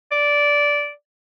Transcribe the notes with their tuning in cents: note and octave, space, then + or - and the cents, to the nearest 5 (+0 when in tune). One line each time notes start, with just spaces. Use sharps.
D5 -10